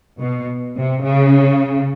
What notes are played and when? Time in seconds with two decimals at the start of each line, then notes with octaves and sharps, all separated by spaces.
0.19 B2
0.76 C3
1.03 C#3